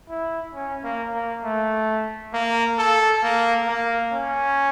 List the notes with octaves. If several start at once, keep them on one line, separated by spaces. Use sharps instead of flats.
E4
C#4
A#3
A#3
A3
A#3
A4
A#3
A#3
C#4